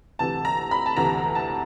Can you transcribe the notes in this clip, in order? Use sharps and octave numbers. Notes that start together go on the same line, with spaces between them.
D2 C3 E3 A5
A#5
B5
A5
D2 C3 E3 A#5
A5